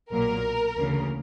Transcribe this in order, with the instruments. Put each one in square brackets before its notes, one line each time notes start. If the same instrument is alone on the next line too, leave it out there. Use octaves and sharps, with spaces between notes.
[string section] B1 A#2 F#3 A#3 A#4
D2 C#3 E3 A#3